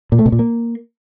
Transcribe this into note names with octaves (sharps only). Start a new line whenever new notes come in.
A#2
A3
B2
A#2
A#3